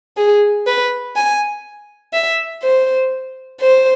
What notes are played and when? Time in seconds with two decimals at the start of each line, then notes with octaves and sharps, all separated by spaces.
0.17 G#4
0.67 B4
1.15 G#5
2.13 E5
2.62 C5
3.60 C5